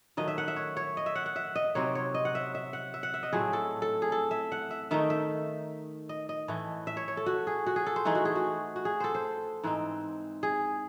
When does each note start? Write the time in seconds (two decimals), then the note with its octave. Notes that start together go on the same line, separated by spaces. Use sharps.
0.17 D#3 F#3 A3 D#5
0.28 E5
0.38 F#5
0.48 E5
0.56 C#5
0.77 C#5
0.97 D#5
1.06 E5
1.16 F#5
1.26 F#5
1.36 E5
1.56 D#5
1.75 C3 F#3 C4 D#4 C#5
1.95 C#5
2.14 D#5
2.25 F#5
2.35 E5
2.55 E5
2.73 F#5
2.94 E5
3.03 F#5
3.14 E5
3.23 D#5
3.33 A2 F#3 A3 C4 G#4
3.53 A4
3.82 A4
4.02 G#4
4.12 A4
4.31 E5
4.52 F#5
4.71 E5
4.91 D#3 A3 D#4 E5
5.10 E5
6.09 D#5
6.29 D#5
6.48 A2 E3 A3
6.87 E5
6.97 C#5
7.08 C#5
7.17 A4
7.26 F#4
7.47 G#4
7.67 F#4
7.76 G#4
7.86 A4
7.96 C5
8.05 E3 A3 D#4 G#4
8.15 F#4
8.25 G#4
8.35 F#4
8.76 F#4
8.85 G#4
9.00 A4 C5
9.15 C5
9.63 G#2 E3 C4 D#4
10.43 G#4